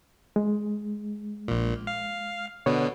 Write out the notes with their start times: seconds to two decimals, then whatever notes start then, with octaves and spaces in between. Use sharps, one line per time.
0.36 G#3
1.48 A#1 A#2
1.87 F5
2.66 B2 D3 B3 C#5